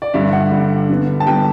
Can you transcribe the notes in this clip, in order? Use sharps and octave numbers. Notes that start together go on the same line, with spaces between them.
D5
G2 D3 G3 E5
F#5
G2 D3 G3
D3 G3 B3
A5
D3 G3 B3 G5